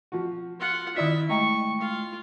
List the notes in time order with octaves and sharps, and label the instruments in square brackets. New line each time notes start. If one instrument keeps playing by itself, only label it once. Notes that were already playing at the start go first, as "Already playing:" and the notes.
[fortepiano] F3 F#4
[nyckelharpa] F4 F#5
[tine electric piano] D#3 B6 [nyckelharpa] E4 E5 [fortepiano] F4 D5 D#6
[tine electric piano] G#3 A3 G5 [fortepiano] D#5 A#5 [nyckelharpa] C#6
[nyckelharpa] F4 F5